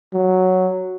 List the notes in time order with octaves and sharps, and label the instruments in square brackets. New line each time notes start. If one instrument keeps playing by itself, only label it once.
[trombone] F#3